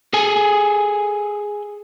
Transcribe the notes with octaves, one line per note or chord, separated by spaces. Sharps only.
G#4 A4 G#5